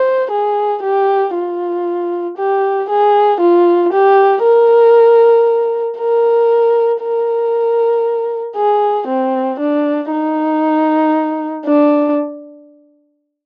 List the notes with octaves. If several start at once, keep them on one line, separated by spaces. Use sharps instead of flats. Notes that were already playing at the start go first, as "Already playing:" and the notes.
Already playing: C5
G#4
G4
F4
G4
G#4
F4
G4
A#4
A#4
A#4
G#4
C4
D4
D#4
D4